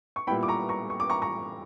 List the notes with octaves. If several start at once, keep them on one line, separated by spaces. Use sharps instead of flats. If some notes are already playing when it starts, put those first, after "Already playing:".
C#6
A#2 G3 B3 E4 G5 B5
D6
A#5 C#6
A#5 C#6
C#6
D6
A#5 C#6
A#5 C#6